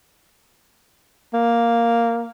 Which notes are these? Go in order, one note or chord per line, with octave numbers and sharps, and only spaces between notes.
A#3